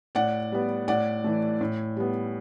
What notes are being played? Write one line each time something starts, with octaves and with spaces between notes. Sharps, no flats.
A2 D5 F#5
G3 B3
A2 D5 F#5
E3 A3
A2
G3 B3